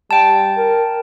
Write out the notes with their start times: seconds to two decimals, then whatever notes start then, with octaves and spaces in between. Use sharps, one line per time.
0.11 G3 G5 A5
0.57 A#4